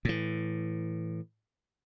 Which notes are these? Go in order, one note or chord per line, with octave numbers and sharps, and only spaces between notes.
A2 E3